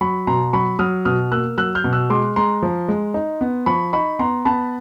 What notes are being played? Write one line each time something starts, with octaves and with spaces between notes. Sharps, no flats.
F#3 B5 C#6
B2 A#5 C6
F#3 B5 C#6
F#3 D#6 F6
B2 D#6 F6
A#3 E6 F#6
F#3 E6 F#6
F6 G6
B2
E6 F#6
G#3 C6 D6
G#3 A#5 C6
F3
G#3
D#4
B3
F3 B5 C#6
D#4 B5 C#6
B3 A#5 C6
B3 A5 B5